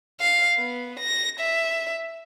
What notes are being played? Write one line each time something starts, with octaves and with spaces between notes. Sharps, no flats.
F5
B3
A#6
E5